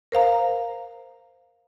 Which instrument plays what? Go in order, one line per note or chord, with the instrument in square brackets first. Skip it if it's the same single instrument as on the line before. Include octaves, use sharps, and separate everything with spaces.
[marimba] A#4 C5 F5 A#5